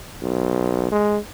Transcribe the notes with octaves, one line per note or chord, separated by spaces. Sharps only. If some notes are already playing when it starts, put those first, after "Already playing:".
B1
G#3